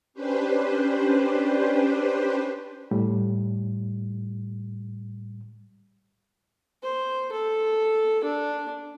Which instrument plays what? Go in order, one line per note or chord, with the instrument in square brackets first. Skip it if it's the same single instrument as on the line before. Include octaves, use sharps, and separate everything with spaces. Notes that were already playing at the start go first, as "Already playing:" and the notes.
[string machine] C#4 D4 G4 B4 C5
[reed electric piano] A2 G3
[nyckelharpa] C5
A4
D4